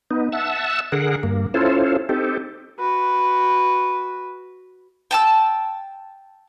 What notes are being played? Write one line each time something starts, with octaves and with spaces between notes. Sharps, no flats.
B3 D#4
E5 F#5 A5 E6
D3 G#4 A#4 F#5
G2 A#3
C#4 E4 F4 A4 C5
C4 D#4 G4 A4
F#4 B4
G5 A5 E6